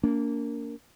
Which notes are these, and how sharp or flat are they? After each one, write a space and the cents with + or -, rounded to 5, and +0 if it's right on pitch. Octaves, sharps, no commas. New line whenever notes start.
A#3 -10 D4 -40